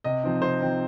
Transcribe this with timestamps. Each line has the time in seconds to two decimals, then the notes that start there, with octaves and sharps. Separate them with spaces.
0.04 C3 D#5
0.23 F3 C4 D#4
0.42 C3 C5
0.61 F3 C4 D#4